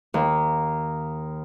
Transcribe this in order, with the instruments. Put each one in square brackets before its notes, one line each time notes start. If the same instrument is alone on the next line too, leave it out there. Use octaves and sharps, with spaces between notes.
[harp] D#2